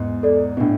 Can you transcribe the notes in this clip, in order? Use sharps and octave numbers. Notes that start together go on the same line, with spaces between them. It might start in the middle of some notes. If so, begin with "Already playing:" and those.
Already playing: E2 G#2
A4 D5
B2
A2 D4